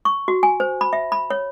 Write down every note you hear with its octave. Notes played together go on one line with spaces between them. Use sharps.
C#6
F#4
G#5
C5
B5
E5
B5
C#5